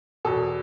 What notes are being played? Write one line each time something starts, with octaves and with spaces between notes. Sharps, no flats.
E2 B2 A4